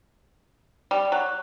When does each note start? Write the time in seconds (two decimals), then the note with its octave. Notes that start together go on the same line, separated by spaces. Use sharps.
0.91 G3
1.12 F#3